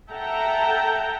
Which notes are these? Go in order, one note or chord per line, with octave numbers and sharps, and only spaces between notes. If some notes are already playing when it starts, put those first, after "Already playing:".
A4 E5 F#5 G5 A5 A#5